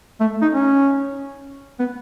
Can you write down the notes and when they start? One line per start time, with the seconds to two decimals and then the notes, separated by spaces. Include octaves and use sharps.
0.21 A3
0.42 D#4
0.52 C#4
1.79 B3